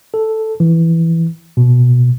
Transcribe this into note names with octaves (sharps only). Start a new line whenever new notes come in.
A4
E3
B2